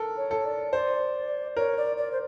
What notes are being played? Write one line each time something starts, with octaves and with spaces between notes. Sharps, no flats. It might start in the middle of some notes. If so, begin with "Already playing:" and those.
Already playing: A4 A#4
C#5
A4
D5
C5 D5
A#4 C#5
D5
D5
C5